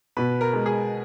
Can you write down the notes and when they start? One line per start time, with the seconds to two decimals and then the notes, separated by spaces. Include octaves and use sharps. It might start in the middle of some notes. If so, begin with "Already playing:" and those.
0.17 B2 B4
0.41 A#4
0.53 G#3
0.66 G#4